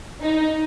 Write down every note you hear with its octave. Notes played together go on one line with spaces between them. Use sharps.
D#4